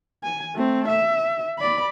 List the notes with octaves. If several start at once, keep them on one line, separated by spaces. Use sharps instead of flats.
G#5
A3 C4
E5
D5 B5